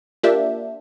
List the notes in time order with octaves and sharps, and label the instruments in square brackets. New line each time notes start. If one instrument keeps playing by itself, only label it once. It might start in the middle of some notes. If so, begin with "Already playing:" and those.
[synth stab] A#3 D4 F4 G4 E5